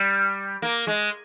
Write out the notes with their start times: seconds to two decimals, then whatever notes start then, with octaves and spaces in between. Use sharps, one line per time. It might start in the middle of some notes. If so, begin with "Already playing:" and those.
Already playing: G3
0.62 A#3
0.87 G#3